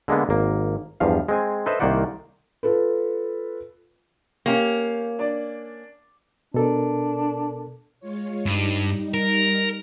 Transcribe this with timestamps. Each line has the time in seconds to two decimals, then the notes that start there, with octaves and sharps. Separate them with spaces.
0.08 D3 G#3 A#3 B3
0.29 G#1 A#3
1.00 E2 G2 F3 F5
1.29 G#3 C4 G#5
1.66 A4 B4 C5 D#5 E5
1.80 C2 D#3 A#3 C5 D5 F#5
2.63 F4 A4 B4
4.46 A#3 C#4 G4 F5
5.19 D4 D5
6.54 B2 D4 A4 A#4
8.00 G#3 F4 C#5
8.46 G2 G3 D#4
9.14 A#4